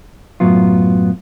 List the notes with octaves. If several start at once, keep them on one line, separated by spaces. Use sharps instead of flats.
F#2 A2 F#3 B3 F4